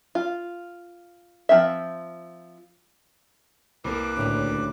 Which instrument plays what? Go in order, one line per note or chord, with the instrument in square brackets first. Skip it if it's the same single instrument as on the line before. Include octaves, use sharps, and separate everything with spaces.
[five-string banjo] F4
F3 C4 E5
[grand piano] C2 A#3 [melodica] B4 D6
[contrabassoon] D2 [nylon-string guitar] A2 C#3 G3